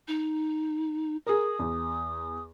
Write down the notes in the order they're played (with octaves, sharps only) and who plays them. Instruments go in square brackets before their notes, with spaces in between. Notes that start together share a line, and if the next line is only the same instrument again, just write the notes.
[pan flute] D#4
[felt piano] G#4 A#4 [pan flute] D#6
[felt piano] E2